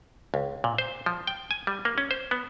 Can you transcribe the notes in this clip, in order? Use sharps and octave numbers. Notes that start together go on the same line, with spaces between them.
C#2
A#2
C5
F3
G5
G#5
G3
A#3
C#4
C5
B3